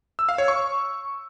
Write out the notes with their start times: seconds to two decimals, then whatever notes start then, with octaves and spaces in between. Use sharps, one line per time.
0.19 E6
0.29 F5
0.38 C#5
0.48 C#6